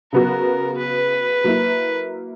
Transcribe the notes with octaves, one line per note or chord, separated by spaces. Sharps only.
C#3 F#3 B3 F#4 A#4
B4
F#3 A#3 E4